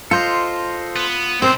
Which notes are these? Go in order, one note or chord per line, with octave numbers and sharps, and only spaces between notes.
F4 A4 C5 D#5
B3
B1 C4 C5